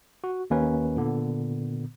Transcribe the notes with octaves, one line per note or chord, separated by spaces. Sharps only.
F#4
D#2 A#3 C#4 B4
A#2 D3 B3